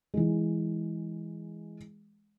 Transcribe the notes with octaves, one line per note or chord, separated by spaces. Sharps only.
E3 G#3